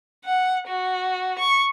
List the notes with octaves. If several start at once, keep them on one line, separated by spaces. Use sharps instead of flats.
F#5
F#4
C#6